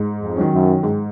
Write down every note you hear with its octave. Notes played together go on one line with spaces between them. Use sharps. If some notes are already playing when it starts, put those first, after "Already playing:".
Already playing: G#2
F2
D#3 F#3 C#4
F#2
G#2